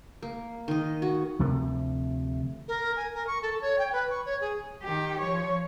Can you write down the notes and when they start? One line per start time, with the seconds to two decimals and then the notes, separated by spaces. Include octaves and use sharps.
0.23 A#3
0.68 D#3 D#5
1.02 F#4
1.39 D2 C3 F3 A3
2.68 A#4
2.96 G#5
3.15 A#4
3.27 C#6
3.42 A4
3.62 C#5
3.79 G5
3.92 B4
4.10 C#6
4.25 C#5
4.41 G#4
4.83 D#3 G4
5.20 F3 C#5